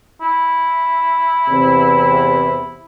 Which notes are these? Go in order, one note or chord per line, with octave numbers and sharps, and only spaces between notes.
E4
E2 C3